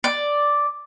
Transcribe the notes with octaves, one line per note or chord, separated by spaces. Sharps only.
D5